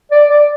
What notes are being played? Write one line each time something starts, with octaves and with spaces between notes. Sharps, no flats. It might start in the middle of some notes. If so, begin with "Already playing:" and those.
D5
D5